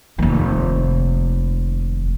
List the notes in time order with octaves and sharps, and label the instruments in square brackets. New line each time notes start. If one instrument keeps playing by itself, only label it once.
[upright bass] F1 D#2